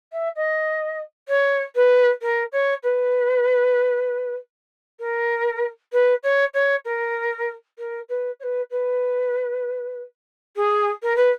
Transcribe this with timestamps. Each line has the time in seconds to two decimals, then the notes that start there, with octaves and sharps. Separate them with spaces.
0.12 E5
0.35 D#5
1.28 C#5
1.75 B4
2.21 A#4
2.52 C#5
2.82 B4
4.99 A#4
5.92 B4
6.22 C#5
6.53 C#5
6.84 A#4
7.77 A#4
8.08 B4
8.39 C#5
8.43 B4
8.70 B4
10.55 G#4
11.02 A#4
11.15 B4